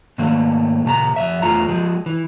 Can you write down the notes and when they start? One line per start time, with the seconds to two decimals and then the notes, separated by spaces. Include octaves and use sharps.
0.18 G#2 D#3 A3 A#3
0.85 A#2 C#3 A5 A#5
1.16 F2 E3 E5
1.42 E2 A3 F4 A#5
1.69 F3 G#3
2.06 E3